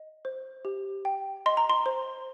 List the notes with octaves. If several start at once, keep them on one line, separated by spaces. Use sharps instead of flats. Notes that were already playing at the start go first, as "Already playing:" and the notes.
Already playing: D#5
C5
G4
G5
D#5 C6
A#5
C6
C5